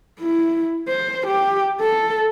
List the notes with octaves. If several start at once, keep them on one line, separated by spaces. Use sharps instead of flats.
E4
C5
G4
A4